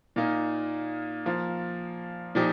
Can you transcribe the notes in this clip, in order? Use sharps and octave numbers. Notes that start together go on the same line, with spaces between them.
A#2 A#3 D#4
F3 A#3 F4
A#2 F3 D#4 G4